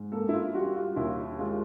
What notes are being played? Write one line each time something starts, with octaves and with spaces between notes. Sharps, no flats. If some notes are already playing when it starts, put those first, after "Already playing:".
Already playing: G#2
A#3 A4
E4
F4
G3 F#4
F4
D#2 E4
G#3 F4